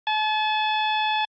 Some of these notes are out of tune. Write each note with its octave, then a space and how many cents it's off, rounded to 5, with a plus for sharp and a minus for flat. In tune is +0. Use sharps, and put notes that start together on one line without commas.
A5 -40